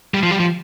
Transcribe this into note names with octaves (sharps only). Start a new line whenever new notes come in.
G3
F3
G3
F3